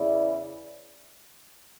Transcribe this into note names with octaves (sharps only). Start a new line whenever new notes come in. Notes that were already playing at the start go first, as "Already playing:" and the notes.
Already playing: E2 C#3 E3 B3 E4 D5